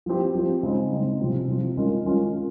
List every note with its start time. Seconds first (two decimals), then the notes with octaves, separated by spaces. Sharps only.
0.06 F3 C4 G4
0.35 F3 C4 G4
0.63 C#3 G#3 C4 D#4
0.92 C#3 G#3 C4 D#4
1.21 C3 F3 C4
1.48 C3 F3 C4
1.77 D#3 G#3 C#4 F4
2.05 D#3 G#3 C#4 F4